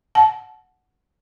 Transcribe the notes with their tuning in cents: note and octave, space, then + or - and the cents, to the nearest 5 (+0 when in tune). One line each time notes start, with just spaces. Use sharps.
F#5 +0 A5 -25